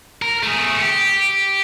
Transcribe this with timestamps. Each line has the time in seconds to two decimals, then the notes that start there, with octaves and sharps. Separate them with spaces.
0.22 A#4
0.43 A3 G#4
0.82 G4